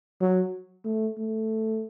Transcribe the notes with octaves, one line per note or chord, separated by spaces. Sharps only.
F#3
A3
A3